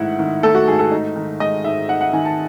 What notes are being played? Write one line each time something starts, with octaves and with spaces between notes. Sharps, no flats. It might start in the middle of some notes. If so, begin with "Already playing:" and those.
Already playing: G#2 D#3 A3 E4 E5 F#5
D#3
A3 A4
F#4
G#2 G#4
A4
D#4
D#3
G#3 D#5
G#2 E5
D#4 F#5
F#5
D#3 G#5
A5